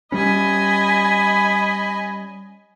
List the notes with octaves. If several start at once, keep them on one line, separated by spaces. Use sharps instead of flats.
G3 C#4 D#5 G#5 B5